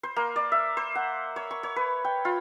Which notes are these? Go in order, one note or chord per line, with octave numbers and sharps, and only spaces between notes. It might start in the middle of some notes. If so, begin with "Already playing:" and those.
C5
A#3
D5
E5
C5
F#5
C#5
C#6
C#5
B4
G5
F4